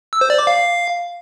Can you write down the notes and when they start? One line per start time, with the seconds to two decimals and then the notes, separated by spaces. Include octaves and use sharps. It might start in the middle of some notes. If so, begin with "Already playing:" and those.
0.13 E6
0.21 C5
0.30 D5
0.39 D6
0.47 F5